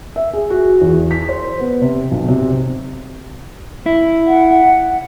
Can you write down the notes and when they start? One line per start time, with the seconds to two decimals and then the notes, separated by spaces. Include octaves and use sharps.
0.16 E5
0.33 G#4
0.50 F#4
0.81 E2
1.11 B6
1.29 C5
1.60 B3
1.82 C3
2.11 B1
2.29 C3
3.86 E4
4.27 F#5